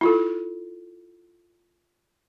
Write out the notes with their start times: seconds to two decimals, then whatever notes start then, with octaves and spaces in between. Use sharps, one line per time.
0.01 E4 F4 A4